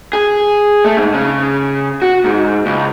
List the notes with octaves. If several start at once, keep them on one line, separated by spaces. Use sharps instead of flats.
G#4
A3
G#2
C#3
F#4
G#2
C#2